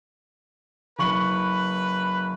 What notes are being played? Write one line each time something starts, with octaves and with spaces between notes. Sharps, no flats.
F#1 B4 C#6 F#7